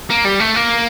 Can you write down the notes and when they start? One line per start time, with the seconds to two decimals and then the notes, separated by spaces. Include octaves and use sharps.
0.10 A#3
0.25 G3
0.40 A3
0.56 A#3